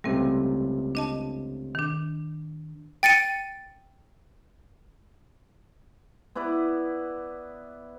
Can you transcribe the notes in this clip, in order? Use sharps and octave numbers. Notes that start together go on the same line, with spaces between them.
C#2 C3 G3 A3 C4
D4 D#5 A5
D#3 D4
G5 A6 C#7 D#7
B3 E4 B4 D5